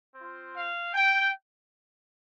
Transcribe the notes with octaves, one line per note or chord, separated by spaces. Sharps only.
C4 F4
F5
G5